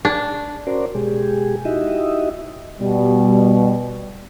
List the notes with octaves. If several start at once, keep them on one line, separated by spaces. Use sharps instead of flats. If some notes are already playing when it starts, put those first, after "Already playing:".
D4
C#4 F#4 A#4 C5 D5
B2 G#3 G4 G#4
D#4 E4 F#4 G4 D#5 E5
B2 G3